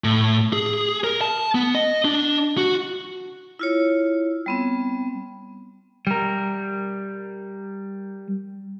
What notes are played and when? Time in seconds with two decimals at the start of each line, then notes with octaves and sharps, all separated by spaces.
0.04 A2
0.53 G#4
1.04 A#4
1.21 A5
1.55 B3
1.75 D#5
2.05 D4
2.57 F#4
3.59 E4 F4 C#5
4.46 G3 B3 C4
6.07 G3 A#4